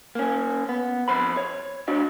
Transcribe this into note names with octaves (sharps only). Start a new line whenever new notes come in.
A#3 C#4
B3
F2 C5 B5
C#5
D4 F#4 D#5